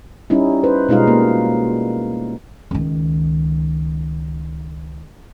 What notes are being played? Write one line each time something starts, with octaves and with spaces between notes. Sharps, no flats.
G3 C#4 D#4 E4
B4 C5
B2 G3 G#3 D#4 F4 F5
A#3
C#2 D#3